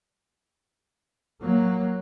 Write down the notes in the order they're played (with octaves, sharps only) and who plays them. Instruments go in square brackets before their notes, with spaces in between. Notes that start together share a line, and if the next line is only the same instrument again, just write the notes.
[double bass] F#3 A#3